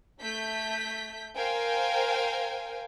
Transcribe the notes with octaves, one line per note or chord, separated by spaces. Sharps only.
A3 G6 B6
A#4 C5 F5 G5 G#5